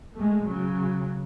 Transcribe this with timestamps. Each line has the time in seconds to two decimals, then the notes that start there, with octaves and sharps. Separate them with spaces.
0.14 G#3 A3
0.44 C#3 F#3